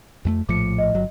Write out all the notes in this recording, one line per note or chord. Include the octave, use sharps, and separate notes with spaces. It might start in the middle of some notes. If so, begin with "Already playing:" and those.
F2 G#3 A3
A#1 A2 F3 D6 C#7
D#5
G1 F#3